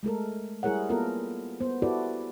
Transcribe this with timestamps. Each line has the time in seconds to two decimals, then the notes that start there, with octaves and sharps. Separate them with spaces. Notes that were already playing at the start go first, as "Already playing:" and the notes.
0.03 G#3 A3 A4 A#4
0.63 G3 E4 G#4 A#4 C#5 F#5
0.89 A#3 B3 F4 A4 A#4
1.60 B3 C5
1.82 E4 F#4 G4 A4 B4 D5